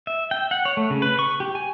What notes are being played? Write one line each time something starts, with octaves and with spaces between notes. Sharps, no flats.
E5
G5
F#5
C#5
A3
C#3
B4
C#6
G4
G#5